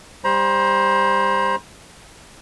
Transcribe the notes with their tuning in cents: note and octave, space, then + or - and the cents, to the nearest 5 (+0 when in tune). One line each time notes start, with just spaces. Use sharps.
G3 +15 C5 +15 A#5 +40